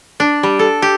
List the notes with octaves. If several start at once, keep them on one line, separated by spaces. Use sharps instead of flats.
D4
G3
A4
G4